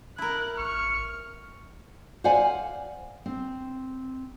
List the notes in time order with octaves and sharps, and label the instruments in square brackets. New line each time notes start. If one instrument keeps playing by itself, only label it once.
[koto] E4 A#4 [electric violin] F#6
[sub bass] A1 [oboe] C#6 [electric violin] F6
[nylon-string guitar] C5 D5 F5 F#5 G#5
C4